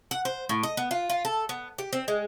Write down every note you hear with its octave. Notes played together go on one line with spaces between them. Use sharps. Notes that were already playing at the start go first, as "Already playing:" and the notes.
F#5
C5
A2
D#5
B3
F4
F4
A4
B3
G4
C4
G#3